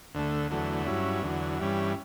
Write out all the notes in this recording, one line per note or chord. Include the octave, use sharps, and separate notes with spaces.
D2 D3 A3
E2 D3 F#3 A3
G2 F#3 C#4 E4
E2 D3 F#3
G2 E3 G3 C#4